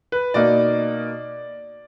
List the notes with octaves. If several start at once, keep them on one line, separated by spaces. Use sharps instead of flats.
B4
B2 A#3 D#4 D5